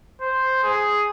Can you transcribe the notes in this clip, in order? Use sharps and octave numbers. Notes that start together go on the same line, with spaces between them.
C5
G#4